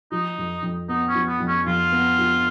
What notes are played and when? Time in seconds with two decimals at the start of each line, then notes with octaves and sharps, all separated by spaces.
0.12 F3 D#4
0.38 F2
0.63 F2
0.88 B3 D#4
1.08 C#4
1.15 F3
1.28 B3
1.40 F2
1.47 C#4
1.66 F2 F4
1.92 B3
2.19 F3